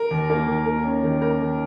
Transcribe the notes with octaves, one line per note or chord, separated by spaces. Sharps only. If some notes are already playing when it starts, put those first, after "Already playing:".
Already playing: A#4
D#2
A#3
D#3
A#3
C#4
D#3
A#3 A#4
D#3